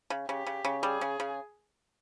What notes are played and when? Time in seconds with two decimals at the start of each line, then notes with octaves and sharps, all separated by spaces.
0.10 C#3
0.29 C#3 G4
0.46 C#3
0.65 C#3
0.83 G3 G#4
1.01 C#3
1.20 C#3